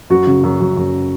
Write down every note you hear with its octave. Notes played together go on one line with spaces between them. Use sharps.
F#2 F#4
C#3
F#2
F#2
F#2